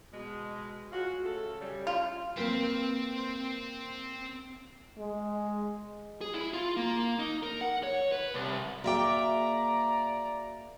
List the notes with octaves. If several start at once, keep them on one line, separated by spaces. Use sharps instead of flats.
B2 G#3
G#3 F4 F#4
C#3 A3 A4
C#3 G3
F4
A#3 C4 A#4 B4 G5
G#3
G#4
E4
F4
A#3
D#4
A#4
F#5
C#5
B4
C2
A#3 F#4 G#4 D5 E5 G5 A#5 D6